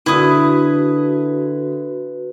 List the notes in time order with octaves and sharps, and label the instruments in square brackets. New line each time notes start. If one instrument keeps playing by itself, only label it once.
[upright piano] D3 [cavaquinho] E4 D#6 [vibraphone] F#4 B4